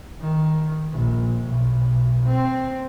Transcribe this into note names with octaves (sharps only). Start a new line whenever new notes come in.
D#3
A#1
B1
C4